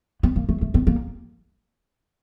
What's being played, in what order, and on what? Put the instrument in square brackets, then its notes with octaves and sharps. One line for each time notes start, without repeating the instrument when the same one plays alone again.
[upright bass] B3
A#3
A3
A3
B3
A#3